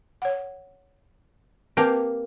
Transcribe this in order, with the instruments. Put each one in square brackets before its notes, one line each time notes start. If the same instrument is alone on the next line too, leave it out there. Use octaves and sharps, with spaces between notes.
[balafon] C#5 F#5
[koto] A#3 G4 F5 [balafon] C4 B4 A5